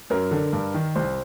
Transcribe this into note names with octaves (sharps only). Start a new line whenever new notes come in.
F#2 A#4
D3
G2
D#3
C2 C5